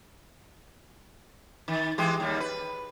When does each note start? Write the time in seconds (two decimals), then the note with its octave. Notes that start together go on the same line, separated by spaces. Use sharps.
1.68 D#3
1.98 E3 G#3 G4
2.20 D#2 G3
2.40 B4